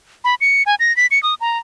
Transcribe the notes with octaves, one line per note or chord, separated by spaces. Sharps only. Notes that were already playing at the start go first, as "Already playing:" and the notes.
B5
C#7
G#5
A#6
B6
C#7
D#6
A#5